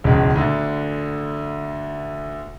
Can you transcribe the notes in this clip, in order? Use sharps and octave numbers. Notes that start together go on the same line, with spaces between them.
E1 C#2
D2 D3